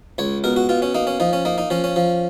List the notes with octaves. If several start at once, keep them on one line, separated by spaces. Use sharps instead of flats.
C#2 C#5
B2 A#4
F#4
B2 F4
C#4
A#3 D#4
C#4
F3 D#4
C#4
A#3 D#4
D#4
F3 C#4
C#4
F3